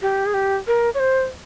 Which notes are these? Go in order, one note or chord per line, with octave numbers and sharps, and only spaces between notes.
G4
G#4
G4
A#4
C#5
C5